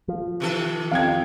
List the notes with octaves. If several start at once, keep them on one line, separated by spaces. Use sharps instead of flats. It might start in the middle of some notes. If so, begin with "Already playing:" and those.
F3
C3 D#3 A4
F2 F5 G5 G#6